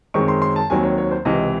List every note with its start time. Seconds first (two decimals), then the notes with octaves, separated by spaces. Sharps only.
0.14 F#2 D#3 G#3 C4 C#6
0.28 C6
0.42 C6
0.56 A5
0.70 D#2 D#3 F#3 C4 G#5
0.83 C#5
0.98 C#5
1.11 C5
1.25 C#2 C3 E3 D#5